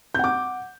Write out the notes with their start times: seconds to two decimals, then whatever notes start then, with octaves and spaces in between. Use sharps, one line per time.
0.15 G6
0.19 F#5
0.24 D6